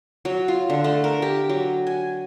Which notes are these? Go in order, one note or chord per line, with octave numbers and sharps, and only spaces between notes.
F#3
F4
D3
A3
A#4
G4
F#3
G#5